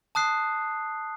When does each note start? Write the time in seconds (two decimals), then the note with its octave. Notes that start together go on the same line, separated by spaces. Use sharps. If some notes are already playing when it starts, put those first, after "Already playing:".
0.15 A5 D#6 F#6 C7